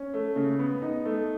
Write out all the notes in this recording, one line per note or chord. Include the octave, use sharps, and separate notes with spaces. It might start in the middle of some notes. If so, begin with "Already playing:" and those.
Already playing: C#4
A3
C#3
B3
D#4
A3